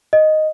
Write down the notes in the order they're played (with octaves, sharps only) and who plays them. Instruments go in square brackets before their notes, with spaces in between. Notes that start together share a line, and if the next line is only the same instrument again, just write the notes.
[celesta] D#5